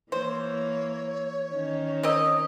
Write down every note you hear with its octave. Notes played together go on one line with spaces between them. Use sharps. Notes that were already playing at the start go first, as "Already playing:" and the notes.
E3 A#3 C5 C#5
D#3 C#4 D#4
C4 A#4 D#5